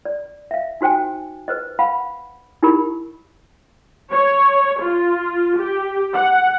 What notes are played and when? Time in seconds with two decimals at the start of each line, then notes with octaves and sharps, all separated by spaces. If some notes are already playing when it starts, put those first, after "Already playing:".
0.05 D5
0.51 E5 F5
0.81 D#4 F#4 C5 G5 G#5
1.48 B4 C5 D#5
1.79 F5 F#5 B5
2.63 D#4 E4 G4 A#4 B5
4.12 C#5
4.82 F4
5.59 G4
6.13 F#5